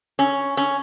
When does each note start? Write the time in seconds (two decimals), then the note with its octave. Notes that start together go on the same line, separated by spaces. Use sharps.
0.19 C#4
0.57 C#4